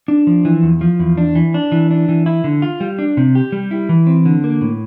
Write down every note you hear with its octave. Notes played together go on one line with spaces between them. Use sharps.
D4
F3
E3
E2
F3
E2
D4
E3
D4
E3
D4
E3
E4
D3
F4
G3
D4
C3
G4
G3
E4
E3
C4
D3
A#3
A2